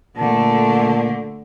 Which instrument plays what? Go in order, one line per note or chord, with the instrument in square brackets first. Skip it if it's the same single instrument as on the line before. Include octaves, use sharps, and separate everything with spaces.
[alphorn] A#2 [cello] D3 A3 [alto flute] A5